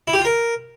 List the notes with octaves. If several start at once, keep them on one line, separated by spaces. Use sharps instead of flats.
E4
G4
F4
A#4